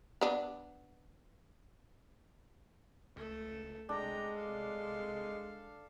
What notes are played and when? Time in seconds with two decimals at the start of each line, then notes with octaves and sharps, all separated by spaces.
0.21 B3 D4
3.16 C#2 A3 A4
3.89 C2 G#3 D4 G5 A#5
4.36 A4 F5